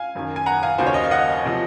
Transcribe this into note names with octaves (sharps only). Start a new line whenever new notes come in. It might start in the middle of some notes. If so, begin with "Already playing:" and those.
Already playing: F5 G#5
F#1 F#2 D#3
G#5
F#5 A#5
F5 G#5
D#2 C#3 F#3 C5
C#5
D#5
F5
D#5 F#5
C3 F3